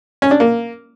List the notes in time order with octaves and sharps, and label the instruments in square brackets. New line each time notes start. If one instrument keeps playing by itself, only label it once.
[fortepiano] C#4
D4
A#3